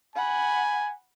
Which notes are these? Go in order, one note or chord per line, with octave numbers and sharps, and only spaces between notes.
F#5 G#5 B5